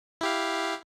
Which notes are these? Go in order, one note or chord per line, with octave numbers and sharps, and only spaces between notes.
E4 G4 F5